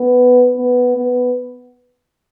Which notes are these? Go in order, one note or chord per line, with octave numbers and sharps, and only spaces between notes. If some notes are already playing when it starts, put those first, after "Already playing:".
Already playing: B3
B3
B3